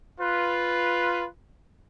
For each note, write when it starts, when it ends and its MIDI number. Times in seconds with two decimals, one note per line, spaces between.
0.20 1.27 65
0.20 1.27 71